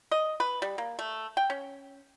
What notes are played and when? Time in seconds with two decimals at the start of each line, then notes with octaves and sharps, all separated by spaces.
0.11 D#5
0.40 B4
0.62 G3
0.78 A#3
0.99 A3
1.37 G5
1.50 C#4